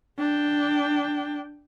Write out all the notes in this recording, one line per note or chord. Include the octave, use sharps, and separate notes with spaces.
D4 G5